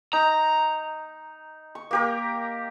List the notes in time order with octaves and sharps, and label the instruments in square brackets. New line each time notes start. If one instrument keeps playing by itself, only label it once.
[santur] D#4 [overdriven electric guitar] A#5
[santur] C#6
A#3 G4 A#4